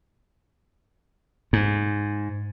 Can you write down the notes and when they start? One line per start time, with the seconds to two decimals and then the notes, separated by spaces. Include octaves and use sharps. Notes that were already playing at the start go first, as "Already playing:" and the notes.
1.53 G#2